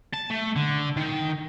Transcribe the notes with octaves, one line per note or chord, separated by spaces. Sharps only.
A5
A3
D3
D#3